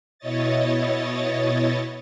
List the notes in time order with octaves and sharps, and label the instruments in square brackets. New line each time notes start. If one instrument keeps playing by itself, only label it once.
[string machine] B2 E4 C#5 D#5 A6